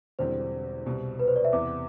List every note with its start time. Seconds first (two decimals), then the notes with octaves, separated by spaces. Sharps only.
0.19 E1 E2 D3 G3 C4 C5
0.86 C2 B2 G3
1.20 B4
1.28 C5
1.36 D5
1.45 E5
1.53 E2 C3 E3 B3 D6